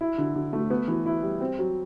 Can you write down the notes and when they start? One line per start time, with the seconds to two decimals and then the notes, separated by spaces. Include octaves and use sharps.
0.01 E4
0.18 D3
0.35 D3
0.53 A3
0.70 B3
0.88 E3
1.06 E4
1.23 G3
1.41 C4
1.59 F#3